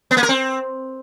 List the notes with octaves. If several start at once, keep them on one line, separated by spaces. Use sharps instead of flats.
B3
A#3
A#4
C4